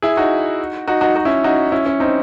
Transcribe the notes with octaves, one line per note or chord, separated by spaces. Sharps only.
E4 G#4
D#4 F#4
D#4 F#4
D#4 F#4
D#4 F#4
C#4 E4
D#4 F#4
C#4 E4
C#4 E4
C4 D#4